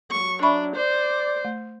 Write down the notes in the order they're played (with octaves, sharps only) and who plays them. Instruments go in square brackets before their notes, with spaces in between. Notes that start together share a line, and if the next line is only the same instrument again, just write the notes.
[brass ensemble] F#3 [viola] C#6
[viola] D4 [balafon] E5 B5 C#6
[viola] C5 [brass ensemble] D5
[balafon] A3